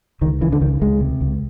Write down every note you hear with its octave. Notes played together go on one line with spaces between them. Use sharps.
C#2 D#3
C#3 E3
D3
C#2 D#3
C#2 G#3
C3
C#2